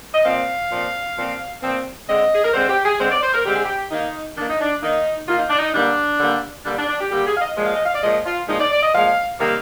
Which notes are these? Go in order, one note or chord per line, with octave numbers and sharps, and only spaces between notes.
D#5
A#2 F3 C4 F5
A#2 F3 C4
A#2 F3 C4
A#2 F3 C4
D3 G#3 C4 D#5
G#4
A#4
D3 G#3 C4 C5
G4
G#4
D3 G#3 C4 C5
D5
C5
A#4
D3 G#3 C4 G4
G#4
G4
D#3 A#3 D#4
D#3 A#3 D4
D#4
D4
D#3 A#3 D#4
D#3 A#3 F4
D#4
D4
D#4
D3 G3 A#3 D4
D3 G3 A#3
D3 G3 A#3 D4
D4
D4
G4
D3 G3 A#3 G4
G#4
F5
D#5
A#2 F3 G#3
F5
D#5
F5
D5
A#2 F3 G#3 D#5
F4
A#2 F3 G#3 D#4
D5
D5
D#5
A#2 F3 G#3 F5
C3 D#3 G3 A#3 F5